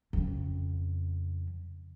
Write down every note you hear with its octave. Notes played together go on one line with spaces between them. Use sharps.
F2 C#3